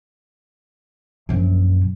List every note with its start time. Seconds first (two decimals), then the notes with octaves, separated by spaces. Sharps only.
1.29 A#1 F#2